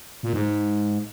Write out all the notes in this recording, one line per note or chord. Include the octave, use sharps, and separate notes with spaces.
A#2
G#2